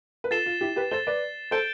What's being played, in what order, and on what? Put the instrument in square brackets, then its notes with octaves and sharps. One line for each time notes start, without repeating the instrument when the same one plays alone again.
[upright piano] B4
[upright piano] F4 A4 [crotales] A6 C7 E7 G7
[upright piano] F4
E4 G4
G4 B4
[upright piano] A4 C5 [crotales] A6 E7 G7
[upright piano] B4 D5
[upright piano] A4 C5 [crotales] G6 D7 G7